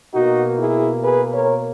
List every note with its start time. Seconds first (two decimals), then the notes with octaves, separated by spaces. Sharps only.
0.14 B2 A#3 D#4 F#4
0.59 E4 G#4
1.04 G#4 B4
1.33 A#4 C#5